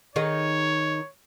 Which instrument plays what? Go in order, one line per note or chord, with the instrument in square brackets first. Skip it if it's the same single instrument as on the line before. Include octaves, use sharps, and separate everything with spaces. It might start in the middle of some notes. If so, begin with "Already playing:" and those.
[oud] D#3 D#4 G#4 [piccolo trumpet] C#5